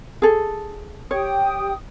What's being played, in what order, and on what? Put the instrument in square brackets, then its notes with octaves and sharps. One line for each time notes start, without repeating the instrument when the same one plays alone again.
[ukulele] G#4 A4
[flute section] G4 G5 D#6 [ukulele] C#5